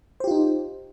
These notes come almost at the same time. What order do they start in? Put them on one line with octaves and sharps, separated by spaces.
C5 G4 F4 D#4